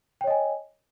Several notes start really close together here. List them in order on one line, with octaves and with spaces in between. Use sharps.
G5 C#5 D#5 G#5